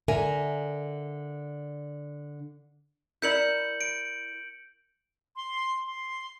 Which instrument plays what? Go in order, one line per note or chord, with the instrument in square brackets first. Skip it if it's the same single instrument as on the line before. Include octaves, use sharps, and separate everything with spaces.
[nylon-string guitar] D3 A#4 E5 G#5
[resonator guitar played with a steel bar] E4 A#4 D5 [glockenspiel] G6 C#7 F#7
[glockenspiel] D7
[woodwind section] C6
C6